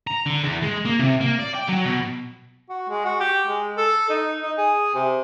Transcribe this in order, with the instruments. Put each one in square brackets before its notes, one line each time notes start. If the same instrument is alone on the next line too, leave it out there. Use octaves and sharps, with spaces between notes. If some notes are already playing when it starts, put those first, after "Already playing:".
[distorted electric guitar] A#5
D3
E2
G#3
A#3
C3
A#3
D5
G5
F#3
B2
[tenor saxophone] F#4
G#3
F#4
G4
G#3
A4
D#4
D#4
G#4
C3